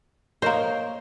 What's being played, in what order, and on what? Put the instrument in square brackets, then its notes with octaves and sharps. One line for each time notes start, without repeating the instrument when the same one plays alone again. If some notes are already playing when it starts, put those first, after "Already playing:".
[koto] A#3 C5 [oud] A#4 C#5 D#5